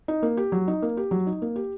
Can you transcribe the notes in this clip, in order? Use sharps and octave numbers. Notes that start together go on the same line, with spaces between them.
D#4
A#3
G4
F#3
D#4
A#3
G4
F#3
D#4
A#3
G4